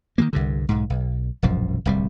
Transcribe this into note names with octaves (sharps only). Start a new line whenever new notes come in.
D#3 F3 A#3
C2 G2 D3
B1 G#2
B1
E1 A#1 F#2 F3
D1 C2 G3